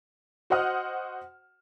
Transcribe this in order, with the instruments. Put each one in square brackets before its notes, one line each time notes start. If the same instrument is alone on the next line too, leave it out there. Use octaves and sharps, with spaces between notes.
[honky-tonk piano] F#4 C5 D#5 F#5 D#6 F6